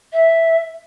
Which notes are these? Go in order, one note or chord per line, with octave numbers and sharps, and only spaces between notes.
E5